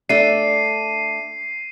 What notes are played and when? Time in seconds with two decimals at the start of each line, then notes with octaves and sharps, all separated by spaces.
0.09 A3 D4 C7 D#7